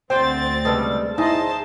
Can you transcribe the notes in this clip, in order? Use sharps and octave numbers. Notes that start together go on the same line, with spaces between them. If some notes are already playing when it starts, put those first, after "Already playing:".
D2 C4 F#4 C5 G5 A6
C#3 G3 G#3 A4 B4
D#4 E4 G#4 C5 D#5 A5